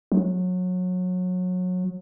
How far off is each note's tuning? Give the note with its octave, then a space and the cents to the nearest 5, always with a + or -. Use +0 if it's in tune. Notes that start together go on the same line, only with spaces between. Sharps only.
F#3 -25